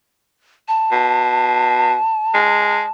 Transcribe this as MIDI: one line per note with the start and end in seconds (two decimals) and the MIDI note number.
0.68 2.91 81
0.92 1.95 47
2.34 2.82 56